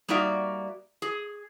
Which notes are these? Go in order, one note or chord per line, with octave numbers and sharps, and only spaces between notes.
G3 A#3 D#4 F#4 D5 E5
G#4